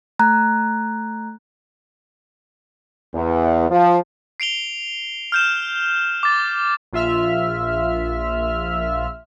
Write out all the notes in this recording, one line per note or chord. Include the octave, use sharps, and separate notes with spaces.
A3 A#5 F#6 G#6
E2
F3
C7 D7 F7 G7
F6 G6 E7
D6 A6
A#1 F4 E5 F6